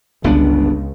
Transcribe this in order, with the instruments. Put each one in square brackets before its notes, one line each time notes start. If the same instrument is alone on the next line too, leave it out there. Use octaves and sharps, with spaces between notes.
[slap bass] G1 B3 D4 [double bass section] C#2